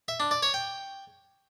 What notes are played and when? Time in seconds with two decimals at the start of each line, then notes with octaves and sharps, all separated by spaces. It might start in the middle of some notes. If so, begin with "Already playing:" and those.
0.08 E5
0.20 D4
0.31 D5
0.43 C#5
0.54 G5